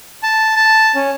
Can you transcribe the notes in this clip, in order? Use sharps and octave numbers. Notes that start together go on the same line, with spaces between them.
A5
A5
C#4